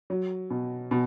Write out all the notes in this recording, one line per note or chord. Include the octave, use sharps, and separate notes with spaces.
F#3
B2
B2